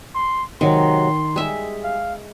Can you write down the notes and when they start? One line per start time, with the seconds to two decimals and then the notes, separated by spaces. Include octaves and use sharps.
0.15 C6
0.61 C3 D#3 F#3 G#3 C6
1.36 G3 G#3 G#4 E5
1.84 F5